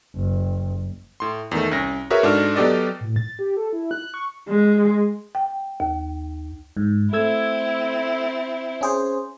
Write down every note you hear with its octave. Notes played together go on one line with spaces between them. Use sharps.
F#1
A2 C6
E2 D#3 A3
C2 C#4 A#6
F#4 G#4 A#4 B4 C#5 E5
G#2 D4 F#4 A4 F6
F#3 B3 G4 A4 D5 D#5
A2
A6
G4
A4
E4
F#6
C#6
G#3
G5
D#2
G#2
A3 C4 E4 E6 G#6
C#4 G#4 C5